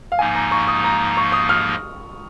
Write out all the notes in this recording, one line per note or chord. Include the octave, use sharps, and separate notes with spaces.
F5
G#2 F3 A#3 D#4 G#5
A#5
C#6
D#6
A#5
C#6
D#6
F6